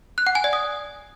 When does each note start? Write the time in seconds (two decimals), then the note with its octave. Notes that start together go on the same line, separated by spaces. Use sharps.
0.18 F#6
0.27 F#5
0.35 G#5
0.44 D5
0.53 D#6